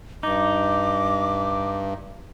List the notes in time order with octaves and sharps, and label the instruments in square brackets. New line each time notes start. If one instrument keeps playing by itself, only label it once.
[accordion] G2 [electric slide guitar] D#4 [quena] D6